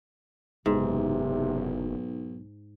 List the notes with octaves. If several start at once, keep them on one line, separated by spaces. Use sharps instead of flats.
F#1 B1 G#2 C3